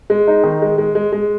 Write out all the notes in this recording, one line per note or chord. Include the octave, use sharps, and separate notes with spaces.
G#3
D#4
D#3
G#3
G#3
G#3
G#3